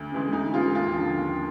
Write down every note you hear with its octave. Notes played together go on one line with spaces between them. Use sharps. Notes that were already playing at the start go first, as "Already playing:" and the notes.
Already playing: D2
C#3 E3 G#3
D2 D#4
C#3 E3 G#3 F4
D#2 F4
D3 F3
D#2